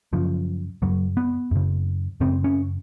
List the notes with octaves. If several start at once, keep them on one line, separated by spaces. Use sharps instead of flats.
F#2 C#3 F3
F#2 C#3 F#3
B3
F#2 C#3
F#2 C#3 C4
C#4